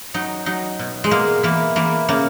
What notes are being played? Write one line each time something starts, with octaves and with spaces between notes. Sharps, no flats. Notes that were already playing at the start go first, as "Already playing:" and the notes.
F#3 D#4
F#3 D#4
B2
G#3
B2 A#3
E3 A#3
E3 A#3
C#3 A#3